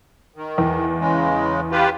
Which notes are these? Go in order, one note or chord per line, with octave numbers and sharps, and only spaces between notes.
D#3
E2
C#3 G#3
F4 G4 B4